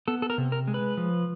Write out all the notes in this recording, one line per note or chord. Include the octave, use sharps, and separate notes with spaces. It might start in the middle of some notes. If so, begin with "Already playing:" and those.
B3 A4
A4
A#4
C3
A#4
G#3
B4
F3